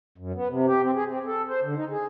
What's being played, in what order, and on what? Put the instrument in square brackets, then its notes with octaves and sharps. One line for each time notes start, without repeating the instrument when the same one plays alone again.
[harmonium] F#2
B3
C3
G4
C4
G#4
C4
A4
C5
D3
D#4
G#4